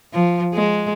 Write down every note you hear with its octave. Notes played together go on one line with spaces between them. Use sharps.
F3
G#3